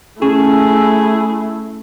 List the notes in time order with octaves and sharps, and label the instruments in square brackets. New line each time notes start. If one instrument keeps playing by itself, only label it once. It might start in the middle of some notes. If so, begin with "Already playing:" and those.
[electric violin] A3 E4 [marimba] C#4 [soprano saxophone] G#4